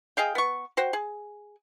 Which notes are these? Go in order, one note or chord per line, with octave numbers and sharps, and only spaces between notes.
G#4 D#5 F5 G5
B3 C#6
F#4 C5 G5
G#4